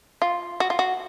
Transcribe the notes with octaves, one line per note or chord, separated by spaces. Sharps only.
F4
F#4
F4
F#4